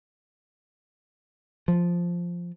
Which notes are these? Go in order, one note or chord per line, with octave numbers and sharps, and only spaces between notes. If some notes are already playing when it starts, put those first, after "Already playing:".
F3